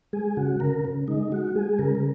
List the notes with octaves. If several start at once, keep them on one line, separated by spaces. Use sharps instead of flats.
G#3 G#4
C#3 F#4
C#3 A#4
C#3
G#3 D#4
G#3 F#4
G#3 G#4
C#3 A#4
A#4